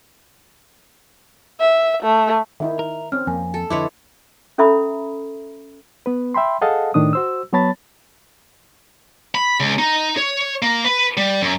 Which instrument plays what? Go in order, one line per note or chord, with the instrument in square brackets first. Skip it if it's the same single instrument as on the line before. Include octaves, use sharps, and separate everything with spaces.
[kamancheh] E5
A3
[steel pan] D#3 D#4 E4 [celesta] E5
[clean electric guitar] A#4
[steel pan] C4 C#4 [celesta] F6
[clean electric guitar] F2 [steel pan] A#3 [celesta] G#5
[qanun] A4
[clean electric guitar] F2 D3 [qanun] E4 B4 C#5 [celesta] D#5 C6 D6
[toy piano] C#4 A4 E5 A#5 B5 D#6
[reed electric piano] B3 B4
E5 G5 B5 C6
G#4 A4 D#5 F5 F#5 A5
A2 D#3 D4 D#6
F#4 C5 E6
F#3 B3 C#5 A5 B5 A6
[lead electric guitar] B5
C#2
D#4
C#5
A#3
B4
G3
F#2